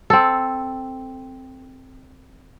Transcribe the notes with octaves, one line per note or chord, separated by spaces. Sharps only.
C4 A4